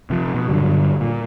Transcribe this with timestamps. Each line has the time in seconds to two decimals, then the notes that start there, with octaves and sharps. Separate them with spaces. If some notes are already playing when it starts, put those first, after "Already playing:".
0.10 C3 F3
0.34 B2
0.48 G2 D3 F#3
1.00 A#2